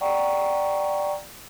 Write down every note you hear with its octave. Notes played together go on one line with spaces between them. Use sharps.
D5 F#5 G5 A#5 C#6